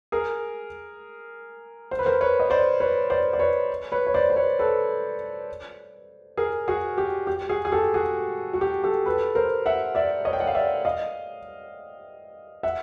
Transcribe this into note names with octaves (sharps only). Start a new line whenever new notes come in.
G#4 A#4
C5
B4
A#4 C5
B4 C#5
D#5
C5 D5
B4 C#5
C5 D5
D5
B4 C#5
B4 C#5
C#5
C5 D5
C5
B4 C#5
A4 B4
G#4 A#4
F#4 G#4
G4
G4
F#4 G#4
G#4
G4 A4
F#4 G#4
F#4
G4
G4 A4
A4 B4
A#4 C5
E5 F#5
D5 E5
C#5 D#5
G5
F#5
F5
D5 E5
D#5 F5
E5 F#5